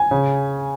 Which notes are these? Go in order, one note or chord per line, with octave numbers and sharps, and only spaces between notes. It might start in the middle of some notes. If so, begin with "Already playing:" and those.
Already playing: G#5
C#3